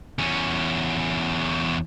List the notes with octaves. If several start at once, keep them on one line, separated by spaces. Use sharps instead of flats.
E2 C#4